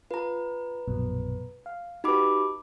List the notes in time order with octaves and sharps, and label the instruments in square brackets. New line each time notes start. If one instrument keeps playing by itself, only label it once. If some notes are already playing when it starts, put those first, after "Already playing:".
[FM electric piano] F4 [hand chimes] B4 A#5
[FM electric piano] A#1 F#2 B2
F5
[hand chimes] D#4 B5 D6 [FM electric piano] F#4 G4 B4